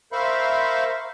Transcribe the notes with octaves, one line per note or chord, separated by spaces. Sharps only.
A#4 C5 E5 F5 B5 C#6